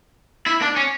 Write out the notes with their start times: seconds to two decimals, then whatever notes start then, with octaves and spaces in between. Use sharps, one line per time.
0.46 E4
0.62 D4
0.76 C#4